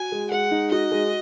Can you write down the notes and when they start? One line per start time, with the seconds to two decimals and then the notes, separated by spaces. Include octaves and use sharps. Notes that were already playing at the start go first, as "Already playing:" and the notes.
Already playing: F#4 G#5
0.12 G#3
0.31 G#3 F#5
0.51 D#4
0.71 F#4 D#5
0.92 G#3